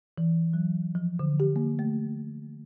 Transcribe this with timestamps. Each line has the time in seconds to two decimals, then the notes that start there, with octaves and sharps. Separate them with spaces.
0.18 E3
0.53 F#3
0.95 F3
1.19 D3
1.40 G4
1.56 A#3
1.79 A3